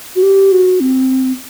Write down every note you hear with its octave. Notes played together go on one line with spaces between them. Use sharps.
F#4
G4
F#4
C4